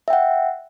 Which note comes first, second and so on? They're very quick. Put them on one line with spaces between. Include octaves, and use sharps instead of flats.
E5 G5 F#5